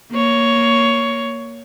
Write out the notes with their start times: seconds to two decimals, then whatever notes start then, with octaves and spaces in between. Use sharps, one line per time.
0.12 A#3 C#5